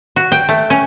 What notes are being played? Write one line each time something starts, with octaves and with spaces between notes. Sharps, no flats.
F#4
G5
A3
C#4